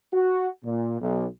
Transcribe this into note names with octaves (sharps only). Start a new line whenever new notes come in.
F#4
A#2
B1